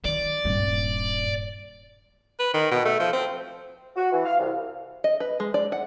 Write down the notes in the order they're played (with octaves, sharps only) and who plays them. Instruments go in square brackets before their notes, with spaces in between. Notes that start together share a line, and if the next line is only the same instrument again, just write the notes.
[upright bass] D#3 [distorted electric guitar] D5
[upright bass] D#1 G2
[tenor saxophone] B4
D#3
B2
A3
F3
C4
[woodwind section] F#4
E3
F5
C2
[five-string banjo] D#5
B4
G#3
D5
F#5